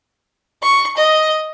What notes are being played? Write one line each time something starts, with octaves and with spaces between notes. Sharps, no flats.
C#6
D#5